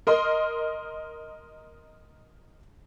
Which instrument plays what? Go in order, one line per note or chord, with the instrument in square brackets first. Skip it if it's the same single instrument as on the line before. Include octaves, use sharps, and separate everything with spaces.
[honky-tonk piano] A#4 D#5 C6